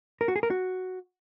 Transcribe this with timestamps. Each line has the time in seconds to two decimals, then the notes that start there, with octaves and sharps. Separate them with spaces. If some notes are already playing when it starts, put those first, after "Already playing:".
0.21 A#4
0.28 F#4
0.36 G#4
0.43 A#4
0.50 F#4